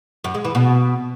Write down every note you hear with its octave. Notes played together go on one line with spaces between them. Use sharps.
F#2
G#3
E3
B2